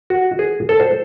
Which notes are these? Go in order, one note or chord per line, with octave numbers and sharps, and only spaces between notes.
F#4
G#4
A4
C5